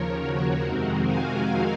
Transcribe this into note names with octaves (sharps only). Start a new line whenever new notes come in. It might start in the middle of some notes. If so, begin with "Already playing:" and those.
Already playing: D#2 C#3 F3 A#4 C#5
F#4 A#4
F2 C3 D#3 G#3 C4
F5 G#5